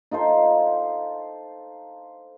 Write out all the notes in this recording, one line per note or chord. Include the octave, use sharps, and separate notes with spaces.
D#4 F4 A4 C5